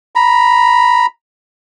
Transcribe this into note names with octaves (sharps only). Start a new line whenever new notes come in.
A#5 B5